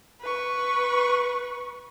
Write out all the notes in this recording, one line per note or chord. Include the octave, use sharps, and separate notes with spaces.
B4 C#6